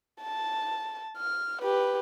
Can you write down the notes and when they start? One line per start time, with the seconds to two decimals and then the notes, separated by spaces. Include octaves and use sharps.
0.22 A5
1.18 F6
1.62 G4 B4